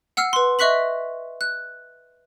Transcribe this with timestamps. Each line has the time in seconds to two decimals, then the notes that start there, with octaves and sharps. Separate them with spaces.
0.17 F#5 E6 F6 C7
0.33 B4 C6
0.59 D#5 E5 C#6 F#6 B6 F#7
1.41 F#6